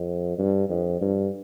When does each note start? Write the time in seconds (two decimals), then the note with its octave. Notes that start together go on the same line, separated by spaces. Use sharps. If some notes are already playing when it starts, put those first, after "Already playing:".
Already playing: F2
0.38 G2
0.69 F2
1.01 G2